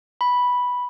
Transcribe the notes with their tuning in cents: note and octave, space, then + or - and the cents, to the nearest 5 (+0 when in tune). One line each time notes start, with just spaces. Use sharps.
B5 -5